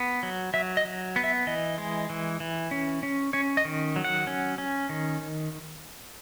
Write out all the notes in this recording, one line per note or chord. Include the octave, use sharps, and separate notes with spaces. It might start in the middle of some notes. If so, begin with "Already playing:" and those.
Already playing: B3
F#3
F#3 E5
D#5
F#3
B3
E5
E3 D#5
G#3
E3
E3
C#4
C#4
C#4 C#5
D#5
D#3
F#3
F#5
C#4
C#4
D#3